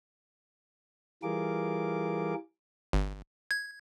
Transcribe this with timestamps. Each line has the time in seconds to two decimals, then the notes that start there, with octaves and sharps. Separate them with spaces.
1.23 E3 G3 F4 G#4 A#4 D6
2.93 G1
3.51 G#6